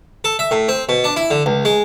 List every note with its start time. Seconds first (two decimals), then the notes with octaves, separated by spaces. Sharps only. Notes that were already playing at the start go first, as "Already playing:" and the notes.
0.24 A4
0.39 E5
0.51 A2
0.68 C4
0.89 B2
1.04 D4
1.16 E4
1.31 D3
1.46 C#2
1.65 G#3